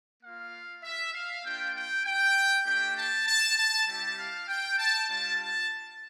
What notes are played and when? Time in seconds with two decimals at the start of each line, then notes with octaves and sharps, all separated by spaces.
0.23 A#3 F4 F5
0.84 E5
1.14 F5
1.44 A#3 D4 F4 G5
1.75 G5
2.05 G5
2.66 A3 D4 G4 G5
2.96 A5
3.27 A5
3.57 A5
3.87 G3 C4 E4 G4 A5
4.17 F5
4.48 G5
4.78 A5
5.09 G3 D4 F4 A5
5.39 A5